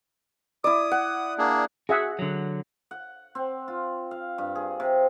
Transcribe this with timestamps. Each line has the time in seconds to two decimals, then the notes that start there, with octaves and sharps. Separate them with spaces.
0.64 E4 D5 D#6
0.91 F#5
1.38 A#3 D4 G#4
1.89 F#4 G#4 E5 F#5
2.19 D3 F#3
2.91 F#5
3.35 C4
3.68 F4
4.11 F5
4.38 G2
4.55 G#4
4.80 C3